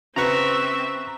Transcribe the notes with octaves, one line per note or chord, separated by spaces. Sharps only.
C#3 C4 F#4 B4 E5 A#5 C#6